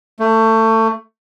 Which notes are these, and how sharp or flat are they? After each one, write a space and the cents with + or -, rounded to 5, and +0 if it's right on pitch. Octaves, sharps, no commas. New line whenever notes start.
A3 +25